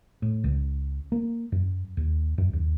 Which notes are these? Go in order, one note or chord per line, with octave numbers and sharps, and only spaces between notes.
A2
C#2
A#3
F#2
D#2
F#2
D#2